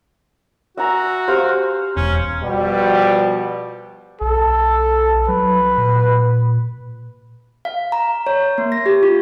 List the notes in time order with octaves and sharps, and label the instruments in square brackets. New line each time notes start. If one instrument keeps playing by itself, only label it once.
[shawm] F#4 [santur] E5 G#5 A#5
[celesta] G4 [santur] C5 F5
[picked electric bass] E1 [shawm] C#4
[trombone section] B2 F3 G3
[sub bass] B1 [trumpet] A4
[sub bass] F#3 [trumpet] B4
[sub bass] A#2
[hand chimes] F5
A#5
C#5
A#3
A#6
G4
F4